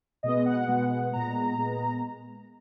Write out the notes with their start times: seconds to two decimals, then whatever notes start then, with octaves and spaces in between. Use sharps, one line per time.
0.23 B2 G#3 B3 D#5
0.46 F#5
0.67 B2 G#3 B3
1.12 A#2 G#3 B3 A#5
1.58 A#2 G#3 B3